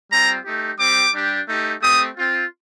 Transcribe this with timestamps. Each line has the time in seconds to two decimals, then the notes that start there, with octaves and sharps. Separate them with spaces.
0.11 G3 C4 F4 A#5
0.45 A3 D#4 G4
0.79 G3 C4 G4 D6
1.14 G3 D4 G4
1.48 A3 D#4 G4
1.82 A3 C4 G4 D#6
2.16 C4 F4